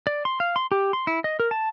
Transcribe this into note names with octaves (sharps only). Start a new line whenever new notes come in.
D5
C6
F5
C6
G4
C6
E4
D#5
A#4
A5